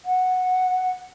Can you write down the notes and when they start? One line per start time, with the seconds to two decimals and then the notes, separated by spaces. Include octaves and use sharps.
0.05 F#5